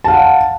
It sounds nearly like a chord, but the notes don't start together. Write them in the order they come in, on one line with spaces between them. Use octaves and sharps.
A5 F5 F#5